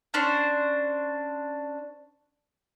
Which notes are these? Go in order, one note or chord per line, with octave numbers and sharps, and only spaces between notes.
C#4 D4 C5